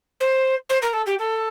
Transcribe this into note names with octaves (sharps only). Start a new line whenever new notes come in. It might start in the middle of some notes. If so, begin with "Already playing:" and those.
C5
C5
A#4
A4
G4
A4